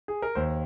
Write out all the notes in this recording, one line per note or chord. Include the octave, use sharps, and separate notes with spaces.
G#4
A#4
D#2 C5